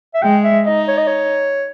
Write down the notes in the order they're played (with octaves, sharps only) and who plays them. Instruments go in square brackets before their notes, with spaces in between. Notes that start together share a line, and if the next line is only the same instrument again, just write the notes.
[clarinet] E5
[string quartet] G#3 [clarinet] G5
[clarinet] E5
[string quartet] D#4 [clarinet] D#5
[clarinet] C#5
D#5
C#5